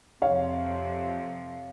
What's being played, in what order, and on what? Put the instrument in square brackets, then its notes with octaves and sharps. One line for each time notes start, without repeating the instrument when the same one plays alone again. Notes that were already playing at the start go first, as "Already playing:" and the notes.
[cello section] F2 C3 F3 [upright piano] C#5 F5